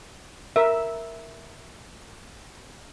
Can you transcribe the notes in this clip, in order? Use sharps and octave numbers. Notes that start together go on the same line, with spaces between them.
A#4 E5